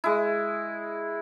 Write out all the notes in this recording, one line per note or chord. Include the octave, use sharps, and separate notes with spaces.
G#3 E4